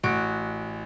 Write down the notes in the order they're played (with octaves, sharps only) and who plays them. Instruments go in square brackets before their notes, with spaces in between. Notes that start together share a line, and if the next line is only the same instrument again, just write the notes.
[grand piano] A1 D7 [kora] F#4